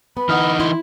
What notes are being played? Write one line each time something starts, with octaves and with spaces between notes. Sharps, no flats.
B3 B5
E3 D#4 F#5 D#6 F6
E4 C6